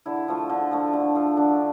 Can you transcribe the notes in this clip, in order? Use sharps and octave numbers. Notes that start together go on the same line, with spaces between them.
D3 E4
F3 A3
D3
F3 A3
D3
F3 A3
D3 D4